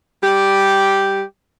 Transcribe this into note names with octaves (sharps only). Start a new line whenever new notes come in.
G3 G4